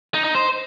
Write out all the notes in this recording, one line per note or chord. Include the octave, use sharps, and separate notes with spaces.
D#4
D#4
C5